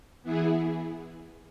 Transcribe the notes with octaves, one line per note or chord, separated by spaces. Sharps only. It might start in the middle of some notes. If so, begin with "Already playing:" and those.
E3 B3 E4 G#4